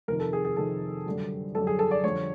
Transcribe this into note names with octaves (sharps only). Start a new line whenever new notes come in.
F2 C3 D#3 A#4
A4
G#4
G#4
F2 C3 D#3 A4
F#2 D3 G3
F#2 D3 G3 A4
G#4
A4
D5
F2 D3 G3 C#5